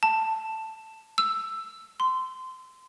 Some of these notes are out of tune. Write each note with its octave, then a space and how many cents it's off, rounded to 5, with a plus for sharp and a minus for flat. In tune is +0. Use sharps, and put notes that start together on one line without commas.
A5 +5
E6 +5
C6 -20